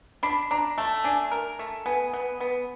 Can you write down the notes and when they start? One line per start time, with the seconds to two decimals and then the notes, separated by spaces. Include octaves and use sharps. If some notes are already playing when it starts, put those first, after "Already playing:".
0.23 D4 B5
0.51 D4 A#5
0.78 A3 A5
1.04 D4 G#5
1.31 A#4
1.59 A3
1.86 B3 G#5
2.13 B3
2.40 B3